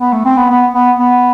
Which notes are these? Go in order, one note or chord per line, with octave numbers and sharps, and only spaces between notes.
B3
A3
C4
B3
B3
B3
B3